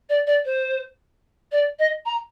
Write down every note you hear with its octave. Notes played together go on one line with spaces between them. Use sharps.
D5
D5
C5
D5
D#5
A#5